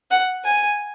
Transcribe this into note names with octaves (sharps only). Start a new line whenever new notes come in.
F#5
G#5